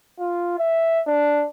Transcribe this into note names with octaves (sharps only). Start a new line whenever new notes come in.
F4
E5
D4